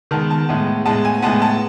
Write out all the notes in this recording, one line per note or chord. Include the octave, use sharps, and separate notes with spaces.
D#3 G#3 B3 A5
A5
A2 G#3 B3
A2 G#3 B3 A5
G#5
A2 G#3 B3 A5
A5